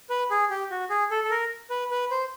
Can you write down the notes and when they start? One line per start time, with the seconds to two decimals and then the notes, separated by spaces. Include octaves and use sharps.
0.10 B4
0.30 G#4
0.50 G4
0.71 F#4
0.90 G#4
1.11 A4
1.24 A4
1.31 A#4
1.70 B4
1.91 B4
2.11 C5